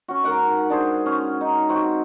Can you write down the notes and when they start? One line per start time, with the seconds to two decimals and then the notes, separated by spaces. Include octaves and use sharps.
0.08 C#4 F#4
0.24 G#2 A#4 F#5 D6
0.70 D4 G#4 C5
1.06 C#4
1.41 D#4
1.69 C3 C4 F#4